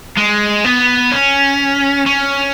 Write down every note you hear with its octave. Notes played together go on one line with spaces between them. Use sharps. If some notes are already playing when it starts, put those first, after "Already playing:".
G#3
B3
C#4
C#4